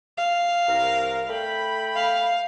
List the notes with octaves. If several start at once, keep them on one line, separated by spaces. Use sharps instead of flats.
F5
C2 A#4
A3 G5 B5
F5